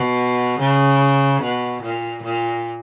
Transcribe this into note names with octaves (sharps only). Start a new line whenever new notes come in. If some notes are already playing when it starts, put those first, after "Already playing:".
Already playing: B2
C#3
B2
A#2
A#2